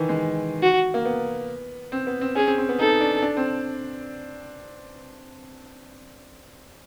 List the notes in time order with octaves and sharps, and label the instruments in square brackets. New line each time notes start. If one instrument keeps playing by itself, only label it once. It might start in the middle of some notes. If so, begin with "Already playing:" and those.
Already playing: [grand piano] D#3 E3
G#3
[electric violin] F#4
[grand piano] A#3
B3
C4
B3
C4
[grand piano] C#4 [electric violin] G#4
[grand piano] C4
C4
B3
[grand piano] D#4 [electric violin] A4
[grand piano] D4
D4
C4